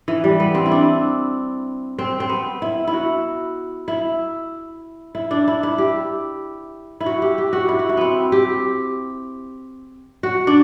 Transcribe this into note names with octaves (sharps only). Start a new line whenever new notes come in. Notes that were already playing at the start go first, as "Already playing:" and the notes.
E3
G3
B3
C4
E4
D4
C4
C4
B3
E4
E4
F#4
E4
E4
D4
E4
E4
G4
E4
F#4
G4
G4
F#4
E4
F#4
E4
B3 C4
G4
F#4
D4